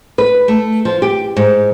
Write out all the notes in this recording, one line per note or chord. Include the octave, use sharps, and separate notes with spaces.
B4
A3
F3
G4
G#2